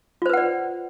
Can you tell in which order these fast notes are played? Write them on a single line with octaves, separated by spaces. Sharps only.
F4 C5 B4 F#5 D5